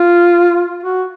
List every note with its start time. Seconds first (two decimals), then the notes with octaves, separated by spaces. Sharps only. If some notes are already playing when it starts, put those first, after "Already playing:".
Already playing: F4
0.84 F#4